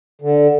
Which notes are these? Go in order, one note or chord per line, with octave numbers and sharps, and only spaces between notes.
D3